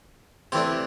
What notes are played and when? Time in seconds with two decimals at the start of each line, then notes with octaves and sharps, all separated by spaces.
0.52 C3 E3 A3 D4 C6